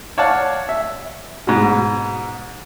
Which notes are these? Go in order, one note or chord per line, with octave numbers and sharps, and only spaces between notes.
C#5 D5 F5 F#5 A5
E5
G#2 B2